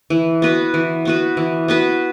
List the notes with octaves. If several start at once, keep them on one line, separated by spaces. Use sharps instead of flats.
E3
B3 F#4 B4
E3
B3 F#4 B4
E3
B3 F#4 B4